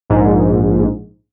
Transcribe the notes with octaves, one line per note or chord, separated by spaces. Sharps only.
A#1 G#2